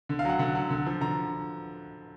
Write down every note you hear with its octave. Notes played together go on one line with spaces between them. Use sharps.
D3
F5
F#3 F#5
D3 F#5
F#3
D3
F3
D3 A#5